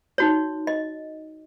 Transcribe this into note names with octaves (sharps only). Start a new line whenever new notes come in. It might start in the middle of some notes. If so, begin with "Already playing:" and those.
D#4 F#4 C#5
D#5